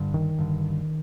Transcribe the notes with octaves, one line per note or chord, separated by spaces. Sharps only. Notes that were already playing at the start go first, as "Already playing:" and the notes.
Already playing: G2 D3
D#3
G2 D3